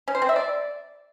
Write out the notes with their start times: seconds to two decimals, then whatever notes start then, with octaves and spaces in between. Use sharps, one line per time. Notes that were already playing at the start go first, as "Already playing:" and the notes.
0.08 C#4
0.15 C5
0.22 C4
0.29 E5
0.36 D5